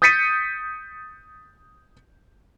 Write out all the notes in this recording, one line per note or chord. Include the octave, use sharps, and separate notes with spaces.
D#6 G6 A6 B6 C#7 D#7